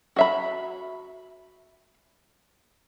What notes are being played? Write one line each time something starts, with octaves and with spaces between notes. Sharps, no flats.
F#4 E5 B5